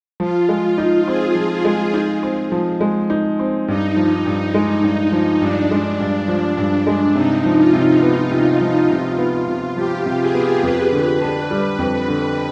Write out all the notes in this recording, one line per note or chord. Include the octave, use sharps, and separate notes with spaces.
F3 F4
G#3
D#4
C4 G#4
F3
F4
G#3
D#4
C4
F3
G#3
D#4
C4
G2 D#4
F3
G2
G#3
G2
F3
G2 D4
G#3
G2
F3
G2
G#3
C3 D#4
F3
F4
C3
B3
C3
F3
C3
B3
C3
F3 G4
C3
G#4
B3
F2 B4
D3
D4
G3
F2
D3